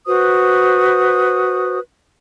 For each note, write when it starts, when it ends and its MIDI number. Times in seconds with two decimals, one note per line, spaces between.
0.07 1.79 66
0.07 1.79 71
0.07 1.79 72
0.07 1.79 87